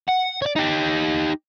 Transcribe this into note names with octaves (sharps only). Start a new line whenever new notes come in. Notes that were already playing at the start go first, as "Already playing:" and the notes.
F#5
C#5 D5
D#4 G4